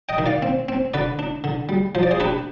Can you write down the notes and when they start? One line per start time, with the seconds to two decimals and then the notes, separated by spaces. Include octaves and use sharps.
0.09 D#5 G5
0.18 D#3
0.26 D5 F5
0.42 C4
0.69 C4
0.94 D3 B4 D5
1.19 D4
1.44 D3
1.69 G3
1.95 F3 C5
2.03 D5
2.11 G#4 C5
2.20 D4 G4 B4